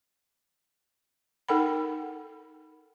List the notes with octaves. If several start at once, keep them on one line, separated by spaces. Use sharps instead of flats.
D#4 A4 A#4 F#5 G5 B5